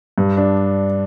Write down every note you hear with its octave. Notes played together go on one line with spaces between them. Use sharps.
G2
D4